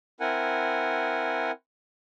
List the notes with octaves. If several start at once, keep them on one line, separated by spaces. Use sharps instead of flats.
C4 E4 A#4 F#5 G#5